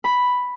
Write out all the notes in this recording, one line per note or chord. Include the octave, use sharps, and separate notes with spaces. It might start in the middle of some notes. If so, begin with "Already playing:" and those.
B5